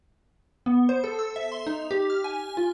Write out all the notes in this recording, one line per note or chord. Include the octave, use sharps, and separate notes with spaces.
B3
C5
A4
E6
E5
C6
D#4
G4
F6
G#5
F4